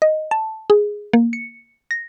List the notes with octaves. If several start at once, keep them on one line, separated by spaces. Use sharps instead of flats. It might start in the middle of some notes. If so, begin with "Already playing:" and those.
D#5
A5
G#4
A#3
C#7
A#6